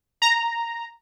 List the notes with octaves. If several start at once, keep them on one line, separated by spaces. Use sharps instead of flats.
A#5